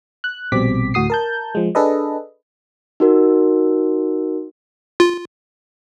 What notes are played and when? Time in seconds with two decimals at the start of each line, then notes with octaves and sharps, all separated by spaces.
0.24 F#6
0.52 A#1 B2 G3 C4 D6 B6
0.94 D2 A2 F#4 D#6 C7
1.10 A#4 A5 G6
1.55 F3 G#3
1.75 D4 G#4 A4 B4 D#5
3.00 D#4 F#4 A#4
5.00 F4